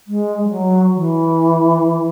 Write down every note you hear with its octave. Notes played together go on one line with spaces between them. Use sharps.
G#3
G3
F#3
E3